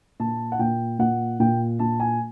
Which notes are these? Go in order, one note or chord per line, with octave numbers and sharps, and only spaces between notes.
A#2 A5
F#5
A#2 G5
A#2 F#5
A#2 G5
A#2 A5
G#5